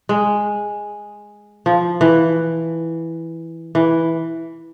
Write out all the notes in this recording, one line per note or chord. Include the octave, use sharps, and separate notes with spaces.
G#3
F3
E3
E3